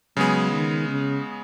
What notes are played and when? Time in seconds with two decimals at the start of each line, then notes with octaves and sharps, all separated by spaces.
0.17 C#3 F#3 G#3 B3 G#4
0.52 D#3
0.88 C#3